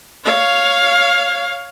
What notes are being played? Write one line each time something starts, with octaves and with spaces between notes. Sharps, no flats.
C#5 F5